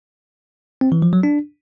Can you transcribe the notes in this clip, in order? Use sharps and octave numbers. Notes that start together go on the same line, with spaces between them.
C4
E3
F3
F#3
D4